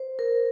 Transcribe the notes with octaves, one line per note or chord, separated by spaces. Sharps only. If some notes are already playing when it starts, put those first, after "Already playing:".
Already playing: C5
A#4